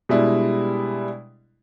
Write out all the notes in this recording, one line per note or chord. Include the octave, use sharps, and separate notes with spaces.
B2 G3 G#3 D4 E4